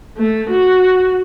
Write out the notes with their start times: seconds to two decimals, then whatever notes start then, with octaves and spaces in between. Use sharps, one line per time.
0.17 A3
0.50 F#4